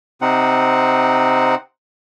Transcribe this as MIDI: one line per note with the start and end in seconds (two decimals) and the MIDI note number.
0.21 1.55 48
0.21 1.55 60
0.21 1.55 63
0.21 1.55 78